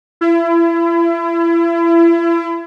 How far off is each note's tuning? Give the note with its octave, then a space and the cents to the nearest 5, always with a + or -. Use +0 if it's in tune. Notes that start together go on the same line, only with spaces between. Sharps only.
E4 +35